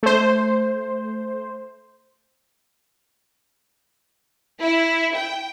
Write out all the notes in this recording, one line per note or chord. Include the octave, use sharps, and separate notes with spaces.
A3 C5
E4
G5